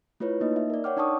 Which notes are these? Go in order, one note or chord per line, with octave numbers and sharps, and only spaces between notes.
A3 E4 F4 B4 C#5
A#3 D#4 D#5
E5
A#4 D5
C#5 F#5 G5 D6 F6
D4 D#4 D5 A5 C#6 D#6